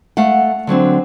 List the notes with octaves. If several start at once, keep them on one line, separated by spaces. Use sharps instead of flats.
A3 F5 F#5
D3 F#3 C4 D4